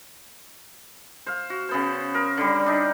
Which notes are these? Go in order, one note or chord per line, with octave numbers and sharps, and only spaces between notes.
C5 F5
F#4
C#3 B3 C5
A#4
D3 G3
D4 D#4